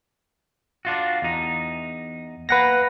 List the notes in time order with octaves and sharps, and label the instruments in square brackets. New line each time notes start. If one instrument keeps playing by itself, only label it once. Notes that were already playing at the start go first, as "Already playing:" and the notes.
[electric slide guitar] D4 F4 F#4
E2 D#4
[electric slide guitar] A#3 [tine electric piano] B4 F#5 A#6